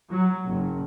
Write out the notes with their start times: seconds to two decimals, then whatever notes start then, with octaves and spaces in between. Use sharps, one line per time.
0.10 F#3
0.47 F#1